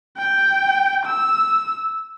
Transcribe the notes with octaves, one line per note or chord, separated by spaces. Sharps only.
G5
E6